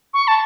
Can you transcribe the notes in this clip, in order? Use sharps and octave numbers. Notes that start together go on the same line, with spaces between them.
C#6
A5